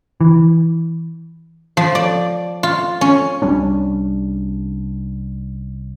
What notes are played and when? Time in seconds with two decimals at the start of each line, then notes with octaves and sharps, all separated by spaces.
0.21 E3
1.77 F3
1.95 D5
2.63 F4
3.01 C#4
3.42 C2 G3 C#4 D4